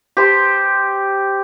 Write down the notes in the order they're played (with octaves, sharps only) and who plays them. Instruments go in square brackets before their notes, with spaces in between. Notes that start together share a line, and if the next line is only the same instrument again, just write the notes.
[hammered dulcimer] G4 C5 A5 C6